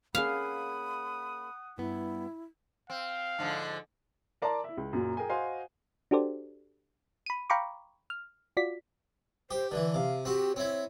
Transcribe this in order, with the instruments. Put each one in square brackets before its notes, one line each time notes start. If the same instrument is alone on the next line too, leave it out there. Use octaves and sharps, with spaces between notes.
[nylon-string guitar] A#3 C#4 G#4 [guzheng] F5 [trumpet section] F#5 D#6 [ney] B5
[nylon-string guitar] G2 B3 [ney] E4
[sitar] C4 [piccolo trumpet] F5
[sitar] G#2 D3 F3
[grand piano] A#4 D5 A5 A#5 C6 D6
E4 E5
C#2
F#2 A#2 F#3
G#4 A#4 G5 G#5
F#4 C5 D#5 F5 G#5 C6
[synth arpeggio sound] D4 F#4 G4 A4 C5 D5
B5 D#7
F5 G5 A#5 B5 C#6 D6
F6
F4 F#4 D5 B6
[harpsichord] G4 [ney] C5
[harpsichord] D3 E3 [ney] B4
[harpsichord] C3 [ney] F5
[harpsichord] C4 F#4 [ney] G4
[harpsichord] C4 E4 [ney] C#5